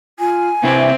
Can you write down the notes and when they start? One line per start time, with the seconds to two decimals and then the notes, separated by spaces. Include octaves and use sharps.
0.19 F4 G#5
0.64 C3 C4 E4 B4 E5